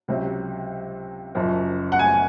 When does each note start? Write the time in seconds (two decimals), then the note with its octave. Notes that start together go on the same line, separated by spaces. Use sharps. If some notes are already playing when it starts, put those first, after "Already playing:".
0.08 C#2 C3 F#3
1.35 F#1 F#2 F3
1.92 F#5
1.99 G#5